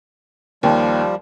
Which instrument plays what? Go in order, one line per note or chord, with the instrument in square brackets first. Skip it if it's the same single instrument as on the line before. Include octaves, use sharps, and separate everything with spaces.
[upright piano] D#2 [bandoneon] F3 G3